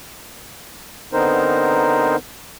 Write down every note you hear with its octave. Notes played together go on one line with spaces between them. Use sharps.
D3 B3 C4 D#4 A#4 C5